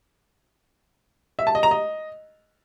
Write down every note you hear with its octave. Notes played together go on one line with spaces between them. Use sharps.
E5
A5
D#5
A#5
D#5